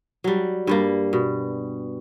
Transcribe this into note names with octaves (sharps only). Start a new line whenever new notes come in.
F#3 G3
G2 G3 A#3
B2